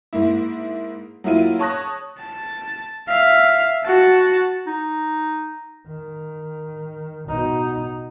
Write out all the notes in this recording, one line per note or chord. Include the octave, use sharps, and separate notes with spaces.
G#2 A#3 E4
F#3 A#3 E4 F4 D#7
C#5 A5 C#6 D#6 F#6 A#6
A5
E5 F5
F#4 A5
D#4
D#3
B2 D#4